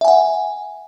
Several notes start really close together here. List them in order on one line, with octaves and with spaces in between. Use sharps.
E5 G#5 F#5